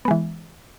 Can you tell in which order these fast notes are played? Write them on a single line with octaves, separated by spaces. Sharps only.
B3 G#3 E3